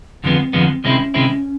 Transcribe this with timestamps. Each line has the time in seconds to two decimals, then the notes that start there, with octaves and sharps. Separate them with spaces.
0.24 F2 D3 F3 G#3 B3 C4
0.53 F2 D3 F3 G#3 B3
0.84 C3 D#3 G#3 C4 C#4 E4
1.14 C3 D#3 G#3 C4 E4